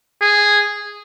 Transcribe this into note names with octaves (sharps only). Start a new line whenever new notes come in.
G#4